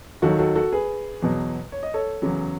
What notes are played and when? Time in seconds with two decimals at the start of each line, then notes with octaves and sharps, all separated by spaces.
0.22 D#2 D#3 F#3 F#4 A4
0.39 F#4 A4
0.56 F#4 A4
0.73 G#4 B4
1.22 E2 B2 F#3
1.72 C#5
1.83 D#5
1.94 A4 C#5
2.22 E2 C#3 F#3